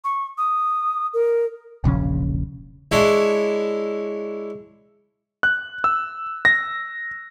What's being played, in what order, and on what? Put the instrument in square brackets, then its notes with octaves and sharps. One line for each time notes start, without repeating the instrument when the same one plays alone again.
[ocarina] C#6
D#6
A#4
[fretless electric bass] E1 A#1 C#3 C#4
[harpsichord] G#3 D4 E4 C#5 F#5
[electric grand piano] F#6
E6
A#6